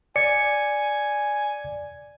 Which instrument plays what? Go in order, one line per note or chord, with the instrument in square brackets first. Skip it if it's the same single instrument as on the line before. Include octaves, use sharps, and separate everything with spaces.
[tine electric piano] D5 C#7 [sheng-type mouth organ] G#5